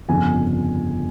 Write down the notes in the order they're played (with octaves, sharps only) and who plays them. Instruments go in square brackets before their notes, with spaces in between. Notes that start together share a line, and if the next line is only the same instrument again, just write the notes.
[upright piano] G1 F2 C#3 F3 G#5